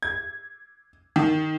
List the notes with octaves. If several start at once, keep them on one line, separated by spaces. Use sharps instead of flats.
G#6
D#3